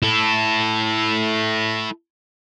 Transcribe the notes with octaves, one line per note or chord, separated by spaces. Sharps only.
E4 A4